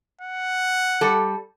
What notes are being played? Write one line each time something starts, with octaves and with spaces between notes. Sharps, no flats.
F#5
G3 A4